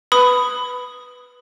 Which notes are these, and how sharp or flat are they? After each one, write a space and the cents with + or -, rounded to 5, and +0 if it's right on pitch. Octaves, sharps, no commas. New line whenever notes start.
B4 +0 B5 +15 D#6 +0